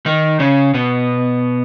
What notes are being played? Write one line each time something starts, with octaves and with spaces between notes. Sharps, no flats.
D#3 D#4
C#3 C#4
B2 B3